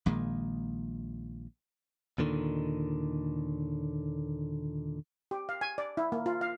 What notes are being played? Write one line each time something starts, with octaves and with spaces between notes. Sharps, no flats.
A#1 A#2 D#3 G#3
D#2 A#2 D3 D#3
G4
F5
G#5
D5
E4
A#3
F4
F5